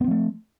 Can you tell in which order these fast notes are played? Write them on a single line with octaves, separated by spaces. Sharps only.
B3 C4 F3 A3